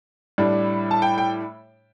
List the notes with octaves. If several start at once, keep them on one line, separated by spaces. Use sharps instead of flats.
A2 G3 D4
A5
G5
G5